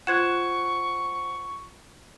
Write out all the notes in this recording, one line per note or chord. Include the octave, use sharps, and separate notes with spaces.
F4 C5 F#5 C#6 F#6 G#6 E7